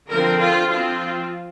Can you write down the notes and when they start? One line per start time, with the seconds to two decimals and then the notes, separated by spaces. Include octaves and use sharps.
0.11 D3 F3 C4 A#4
0.42 F4
0.71 F3 C4 F4